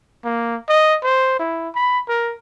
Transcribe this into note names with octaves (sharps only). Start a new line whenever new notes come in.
A#3
D#5
C5
E4
B5
A#4